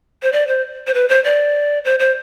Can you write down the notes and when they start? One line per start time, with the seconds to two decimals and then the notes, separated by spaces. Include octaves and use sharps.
0.22 C5
0.32 D5
0.47 C5
0.87 C5
0.94 B4
1.09 C5
1.24 D5
1.85 C5
1.99 C5